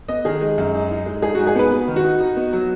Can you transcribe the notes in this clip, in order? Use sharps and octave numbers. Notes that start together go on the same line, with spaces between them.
B3 D#5
D#3 G#4
G#3
F#2
D#4
D#4
G#3
G#2 G#4
G#2 F#4
G#4
B3 B4
B3
D#3
F#4
D#4
D#4
B3
F#3